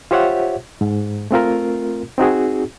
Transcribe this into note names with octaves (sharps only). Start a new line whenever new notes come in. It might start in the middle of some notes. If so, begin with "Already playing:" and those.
F4 G4 C5 C#5 E5 F#5
G#2
A3 C4 F4 A#4
C4 D#4 F#4 G#4